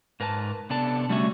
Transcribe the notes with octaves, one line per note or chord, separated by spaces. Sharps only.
G#2 A#4 B4 G#5 A5
C3 B3 D4 A4 A5
D3 G3 A3 C#4 F#4 E5